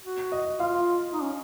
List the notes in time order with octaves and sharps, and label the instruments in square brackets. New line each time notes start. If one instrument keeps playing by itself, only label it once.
[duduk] F#4
[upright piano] D#5
[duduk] F4 [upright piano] F5
[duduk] D#4
C#4